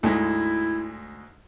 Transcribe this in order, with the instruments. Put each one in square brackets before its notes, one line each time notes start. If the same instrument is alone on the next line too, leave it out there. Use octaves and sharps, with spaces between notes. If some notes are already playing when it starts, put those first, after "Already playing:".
[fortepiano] D2 G#2 [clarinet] E4